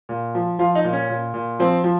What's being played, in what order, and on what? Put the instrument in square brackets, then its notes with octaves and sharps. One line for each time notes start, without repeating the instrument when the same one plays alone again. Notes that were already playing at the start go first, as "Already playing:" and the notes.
[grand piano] A#2
F3
F3 F4
D#4
A#2
C#4
A#2
A#2
F3 C4
F3